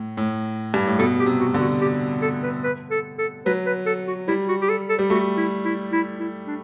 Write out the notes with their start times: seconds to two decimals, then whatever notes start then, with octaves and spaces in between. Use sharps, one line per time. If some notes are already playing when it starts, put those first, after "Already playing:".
Already playing: A2
0.17 A2
0.74 G2
0.87 A2
0.99 B2 A4
1.20 G4
1.26 C3
1.40 F#4
1.54 D3
1.61 F#4
1.81 G4
2.22 A4
2.43 B4
2.64 B4
2.91 A4
3.18 A4
3.46 F#3 B4
3.66 B4
3.86 A4
4.08 F#4
4.28 G3 E4
4.49 F#4
4.62 G4
4.70 A4
4.89 A4
4.99 G3
5.10 A3 F#4
5.37 E4
5.65 E4
5.92 E4
6.19 E4
6.47 D4